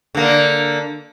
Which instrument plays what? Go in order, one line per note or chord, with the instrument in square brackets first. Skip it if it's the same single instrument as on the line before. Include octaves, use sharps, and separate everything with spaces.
[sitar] D3 A#3